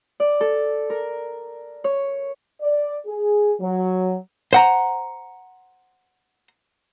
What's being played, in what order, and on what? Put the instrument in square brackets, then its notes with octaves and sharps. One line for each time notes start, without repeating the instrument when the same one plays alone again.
[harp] D5
A4
A#4
C#5
[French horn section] D5
G#4
F#3
[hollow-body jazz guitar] C5 F#5 A#5